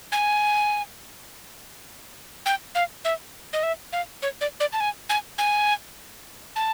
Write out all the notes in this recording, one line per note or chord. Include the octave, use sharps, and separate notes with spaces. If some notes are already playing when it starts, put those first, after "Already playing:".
G#5
G5
F5
E5
D#5
E5
F5
C#5
D5
D5
A5
G#5
G#5
G#5
A5